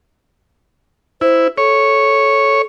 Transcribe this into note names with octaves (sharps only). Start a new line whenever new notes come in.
E4 C5
A4 C#5